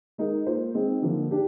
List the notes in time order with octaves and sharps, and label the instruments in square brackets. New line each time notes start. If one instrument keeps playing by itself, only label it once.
[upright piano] G#3 D#4 A#4 D#5
A#3 F4 C5
G#3 C4 D#4 G#4 D#5
D3 F3 A#3
D4 G4